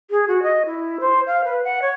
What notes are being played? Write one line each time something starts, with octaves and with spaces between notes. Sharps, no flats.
G#4
F#4
D#5
E4
C5
F5
B4
F#5
C#5